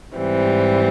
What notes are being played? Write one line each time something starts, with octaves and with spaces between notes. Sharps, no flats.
G#2 E3 G3 C4